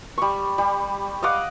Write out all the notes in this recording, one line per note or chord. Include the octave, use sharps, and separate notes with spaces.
G3 C#6
G3
D#5 F5 F#5 D6